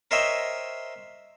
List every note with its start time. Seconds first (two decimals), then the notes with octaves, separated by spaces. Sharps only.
0.11 A#4 C5 C#5 D#5 E5 G5